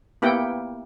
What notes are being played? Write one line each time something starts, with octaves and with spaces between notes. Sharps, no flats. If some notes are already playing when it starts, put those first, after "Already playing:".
A#3 B3 E4 G4 F#5 G5